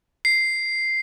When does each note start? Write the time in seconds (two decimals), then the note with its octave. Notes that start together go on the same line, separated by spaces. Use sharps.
0.25 C7